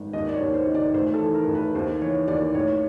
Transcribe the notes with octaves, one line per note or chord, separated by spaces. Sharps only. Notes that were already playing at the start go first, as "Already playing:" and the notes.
Already playing: G#1
D#2 D#5
D5
C#5
D#2
C5
D#3
D5
A1 C5
A4
E3
A#4
A1
B4
D#2 C5
E3 C#5
D#2 D5
A1 C#5